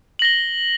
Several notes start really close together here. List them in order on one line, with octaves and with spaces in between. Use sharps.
F#7 A#6 G7